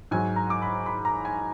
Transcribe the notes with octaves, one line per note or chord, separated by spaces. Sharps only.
G#2 F#3 G#5
A#5
D6
B5
B5
A#5
G#5